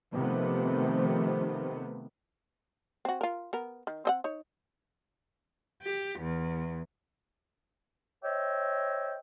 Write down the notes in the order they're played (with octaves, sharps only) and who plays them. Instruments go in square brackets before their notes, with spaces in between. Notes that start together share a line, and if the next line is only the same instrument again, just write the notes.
[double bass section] C3 D#3 F3 A3 B3
[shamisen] C4 F#4
F4 A#4
B3 A#4
D#3
C4 D#5 F#5
D#4 C#5
[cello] G4
E2
[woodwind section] C5 C#5 D#5 E5 G5